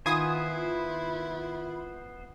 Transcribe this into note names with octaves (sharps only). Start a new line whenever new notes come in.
D#3 B3 E4 F4 C5 G#5 B5 D#6